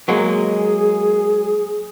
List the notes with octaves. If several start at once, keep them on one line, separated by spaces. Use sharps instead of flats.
F#3 G#3 A#3 G#4